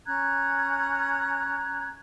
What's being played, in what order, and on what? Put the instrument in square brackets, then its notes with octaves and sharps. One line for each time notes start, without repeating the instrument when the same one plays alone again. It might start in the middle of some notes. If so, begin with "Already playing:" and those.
[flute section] C#4 A#5 F#6 G#6